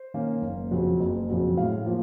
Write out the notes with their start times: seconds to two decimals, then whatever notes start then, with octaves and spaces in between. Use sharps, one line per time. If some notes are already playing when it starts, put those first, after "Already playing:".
Already playing: C5
0.14 D#3 A#3 C#4
0.42 F#1
0.71 F2 C#3 F#3
0.99 F#1
1.29 F2 C#3 F#3
1.57 A2 F5
1.86 F3 A#3